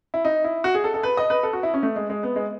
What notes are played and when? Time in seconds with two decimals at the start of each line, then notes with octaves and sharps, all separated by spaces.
0.14 E4
0.25 D#4
0.44 E4
0.64 F#4
0.75 G#4
0.84 A4
0.94 A4
1.03 B4
1.17 D#5
1.30 B4
1.43 A4
1.53 F#4
1.63 E4
1.74 C#4
1.83 A3
1.96 G#3
2.10 G#3
2.23 B3
2.36 G#3